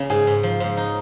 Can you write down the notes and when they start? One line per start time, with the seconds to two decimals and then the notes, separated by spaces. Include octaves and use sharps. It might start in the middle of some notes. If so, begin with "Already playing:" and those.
Already playing: C#3 A#3
0.10 G#2 G#4
0.27 G#2
0.43 F3
0.60 G#2
0.77 D#4